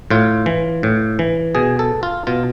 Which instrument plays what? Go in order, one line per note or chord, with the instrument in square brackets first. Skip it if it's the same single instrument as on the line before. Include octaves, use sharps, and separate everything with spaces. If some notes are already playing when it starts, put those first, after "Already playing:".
[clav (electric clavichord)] A2 F4
E3
A2
E3
B2 G#4
A4
F4
B2 F4